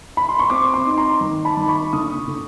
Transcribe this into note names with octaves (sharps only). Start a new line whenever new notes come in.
B5
C6
C#6
C4 C6 D6
C6 D6
D#4
A#5 C6
D#3
A5 B5
D#3
B5 C#6
D3 C#6 D#6
D3